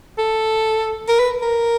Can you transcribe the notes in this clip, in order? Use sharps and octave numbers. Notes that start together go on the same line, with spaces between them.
A4
A#4
B4
A#4